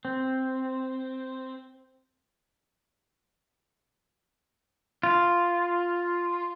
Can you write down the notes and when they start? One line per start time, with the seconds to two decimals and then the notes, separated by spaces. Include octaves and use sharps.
0.05 C4
5.03 F4